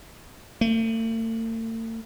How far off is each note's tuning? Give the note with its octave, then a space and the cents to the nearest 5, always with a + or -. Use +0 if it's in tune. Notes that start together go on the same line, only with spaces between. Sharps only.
A3 +45